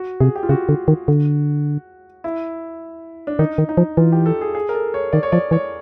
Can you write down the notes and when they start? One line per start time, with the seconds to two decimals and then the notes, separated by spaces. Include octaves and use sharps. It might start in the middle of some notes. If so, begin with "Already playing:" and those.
Already playing: F#4
0.20 C3 G#4
0.36 G4
0.43 F4
0.49 C#3 F#4
0.69 D3
0.88 D#3
1.08 D3
2.24 E4
3.27 D4
3.39 D#3 D#4
3.58 D#3
3.69 D#4
3.77 F3
3.97 E3 F4
4.12 G4
4.26 A4
4.41 G#4
4.55 G#4
4.69 A#4
4.74 A4
4.94 C#5
5.13 D#3 D5
5.23 C#5
5.32 F3 D5
5.51 E3 C#5